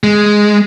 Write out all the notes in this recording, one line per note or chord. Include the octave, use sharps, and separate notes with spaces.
G#3